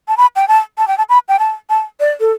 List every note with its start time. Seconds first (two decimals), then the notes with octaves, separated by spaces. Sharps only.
0.08 A5
0.17 B5
0.36 G5
0.48 A5
0.78 A5
0.88 G5
0.98 A5
1.09 B5
1.28 G5
1.39 A5
1.70 A5
2.00 D5
2.20 A4